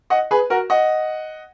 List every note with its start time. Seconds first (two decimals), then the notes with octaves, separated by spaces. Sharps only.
0.10 D#5 F#5
0.31 G#4 B4
0.50 F#4 A#4
0.70 D#5 F#5